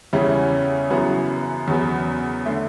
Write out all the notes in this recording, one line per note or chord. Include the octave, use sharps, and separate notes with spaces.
E2 C#3 G3 C#4 E4
F#2 C#3 E3 B3 F#4
E2 C#3 F#3 B3
D3 A3